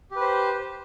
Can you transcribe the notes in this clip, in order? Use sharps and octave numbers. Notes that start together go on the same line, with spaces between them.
G4 B4 C5